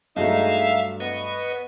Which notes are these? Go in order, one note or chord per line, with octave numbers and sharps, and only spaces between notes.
G2 F#3 G#3 A3 D#4 E5 F5
B3 B4 D#5 C#6